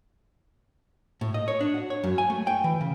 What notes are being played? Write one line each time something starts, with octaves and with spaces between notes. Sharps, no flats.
A2
D#5
C#5
D4
F#4
C#5
F#2
G#5
A3
G5
E3
C#3